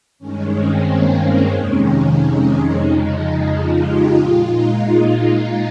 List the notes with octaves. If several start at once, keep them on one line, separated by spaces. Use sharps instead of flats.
G2 D#3 G#3 C#4
C4
A#3
F2 C3 D#3 G#3 C#4
D#4
F2 C#3 F3 G#3 D#4
F4
G4
A#2 G#3 F4
D#4